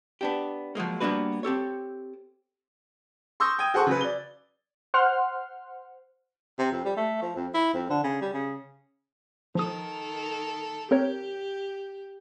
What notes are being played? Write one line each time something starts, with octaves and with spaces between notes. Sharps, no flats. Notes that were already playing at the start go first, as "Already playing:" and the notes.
B3 D4 G4
F3 F#3 G#3 A#3
G3 A#3 B3 D4 F#4 B4
C4 G4 A4 C#5
C6 C#6 D#6 E6 G6 A#6
G5 D#6 G#6 D#7
F#4 G#4 A4 C5 F#5 C#6
C#3 F#3 B4
D5 G7
C5 F#5 C6 F6
C3
F2
G3
A3
F3
F2
E4
F2
D3
C#3
G3
C#3
D#3 F3 A4 A#4 D#6
C4 G4 A#4 C#5